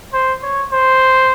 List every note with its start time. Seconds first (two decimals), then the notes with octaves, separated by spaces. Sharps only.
0.13 C5
0.43 C#5
0.72 C5